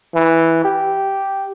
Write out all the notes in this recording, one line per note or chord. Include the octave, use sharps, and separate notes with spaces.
E3
G4